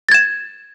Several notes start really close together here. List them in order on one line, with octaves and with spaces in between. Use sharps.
A6 G#6 E7